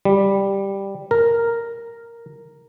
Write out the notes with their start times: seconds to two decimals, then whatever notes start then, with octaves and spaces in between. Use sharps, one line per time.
0.05 G3
1.11 A#4